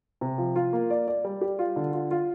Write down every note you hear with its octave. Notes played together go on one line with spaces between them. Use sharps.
C3
F3
F4
A#3
D5
D5
G3
G4
F4
D3
F4
F4